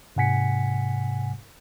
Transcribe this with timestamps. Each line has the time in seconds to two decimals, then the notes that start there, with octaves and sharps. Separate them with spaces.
0.16 G#2 C3 F#5 G#5 B6 C#7